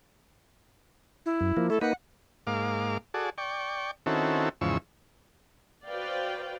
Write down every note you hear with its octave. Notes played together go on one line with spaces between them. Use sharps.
E4
F#2
F3 A#3
A3 E4 A4
A#3 D#4 B4 F#5
G#2 A#3 F5 D6
F#4 G#4 A4 D5
D5 G5 C#6
D#3 C4 C#4 E4 F#4 A4
E2 G#2 C#3 F3 C#6 E6
F#4 B4 C5 D5 F5 G5